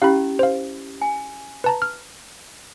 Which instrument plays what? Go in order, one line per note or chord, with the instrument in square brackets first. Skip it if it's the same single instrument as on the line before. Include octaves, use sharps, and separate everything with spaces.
[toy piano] C#4 E4 G4 [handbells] F5 B5
[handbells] C5 F5
[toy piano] G#5
[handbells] B4 A5 A#5
F6